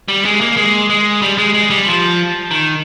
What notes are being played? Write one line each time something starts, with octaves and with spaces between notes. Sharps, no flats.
G3
G#3
A#3
G#3
G#3
G3
G#3
G#3
G3
F3
D#3